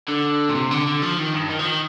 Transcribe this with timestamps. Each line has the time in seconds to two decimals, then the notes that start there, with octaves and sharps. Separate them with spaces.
0.08 D3
0.49 A#2
0.55 C3
0.71 D3
0.86 D3
1.02 F3
1.18 D#3
1.34 G2
1.49 D#3
1.59 F3
1.65 D#3